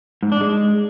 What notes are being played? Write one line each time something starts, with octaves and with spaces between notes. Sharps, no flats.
G#2
D4
G#3